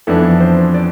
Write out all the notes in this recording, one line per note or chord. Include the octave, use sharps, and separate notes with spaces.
F2 E3 B3 D4 A4
C5
D5